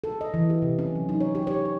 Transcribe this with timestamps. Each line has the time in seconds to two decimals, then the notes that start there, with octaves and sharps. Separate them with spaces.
0.04 A4
0.21 D#5
0.34 E3
0.50 G4
0.62 C3
0.79 C#4
0.95 F#3
1.09 D#4
1.21 C#5
1.35 G4
1.47 C#5
1.65 C#5